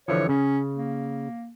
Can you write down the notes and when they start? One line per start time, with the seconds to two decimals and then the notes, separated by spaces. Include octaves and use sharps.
0.08 D3 E3 F3 C#5
0.29 C#3 C#4
0.75 A#3